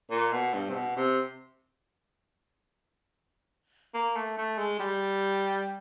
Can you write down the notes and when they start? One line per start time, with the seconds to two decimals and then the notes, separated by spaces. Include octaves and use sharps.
0.11 A#2
0.32 B2
0.53 G2
0.69 C3
0.75 B2
0.97 C3
3.94 A#3
4.16 A3
4.38 A3
4.58 G#3
4.79 G3